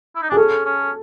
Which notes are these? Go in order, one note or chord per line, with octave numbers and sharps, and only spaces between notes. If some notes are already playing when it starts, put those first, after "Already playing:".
E4
D#4
D4 G#4
C#4 A4
C#4